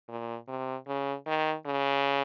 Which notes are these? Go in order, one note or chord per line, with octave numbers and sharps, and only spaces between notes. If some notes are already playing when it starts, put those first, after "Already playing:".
A#2
C3
C#3
D#3
C#3